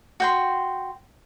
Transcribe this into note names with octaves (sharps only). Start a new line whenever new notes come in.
F#4 G5 C6